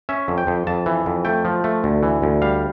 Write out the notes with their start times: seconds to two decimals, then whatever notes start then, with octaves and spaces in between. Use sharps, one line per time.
0.09 C#4 E5
0.28 F2
0.38 G5
0.47 F2
0.67 F2 A5
0.86 E3
1.06 F2
1.25 A3 G5
1.45 F3
1.64 A3
1.84 D2
2.03 E3
2.22 D2
2.42 G3 F5